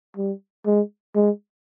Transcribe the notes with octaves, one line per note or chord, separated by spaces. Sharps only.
G3
G#3
G#3